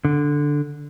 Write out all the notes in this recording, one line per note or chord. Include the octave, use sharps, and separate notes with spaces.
D3